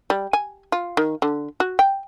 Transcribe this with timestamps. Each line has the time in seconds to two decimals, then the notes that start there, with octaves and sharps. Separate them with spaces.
0.10 G3
0.33 G#5
0.72 F4
0.97 D#3
1.22 D3
1.60 F#4
1.79 G5